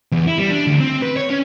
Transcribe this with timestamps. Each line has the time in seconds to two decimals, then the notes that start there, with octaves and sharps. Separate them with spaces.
0.12 E2
0.27 E4
0.38 G3
0.51 D4
0.67 D2
0.80 C4
1.02 B4
1.17 C#5
1.30 C#4